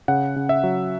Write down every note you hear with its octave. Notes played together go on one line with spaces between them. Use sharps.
C#3 F#5
C#3
E5
F#3